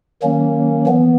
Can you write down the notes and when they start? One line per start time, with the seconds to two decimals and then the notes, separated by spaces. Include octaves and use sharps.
0.23 D#3 F#3 A#3 C#4
0.86 E3 B3